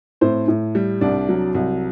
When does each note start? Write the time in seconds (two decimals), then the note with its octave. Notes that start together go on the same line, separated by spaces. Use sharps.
0.21 A2 C4 C5
0.48 A2
0.75 G3
1.01 C2 D4 D5
1.29 F#3
1.55 C2